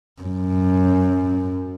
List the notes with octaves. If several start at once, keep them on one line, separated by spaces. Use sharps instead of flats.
F#2